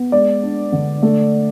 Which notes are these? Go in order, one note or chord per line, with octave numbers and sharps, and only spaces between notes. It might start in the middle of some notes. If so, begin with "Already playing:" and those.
Already playing: B3
G#3 D5
D4
D3
A3